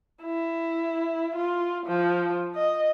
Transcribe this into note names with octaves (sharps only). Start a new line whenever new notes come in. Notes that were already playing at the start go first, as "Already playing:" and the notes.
E4
F4
F3
D#5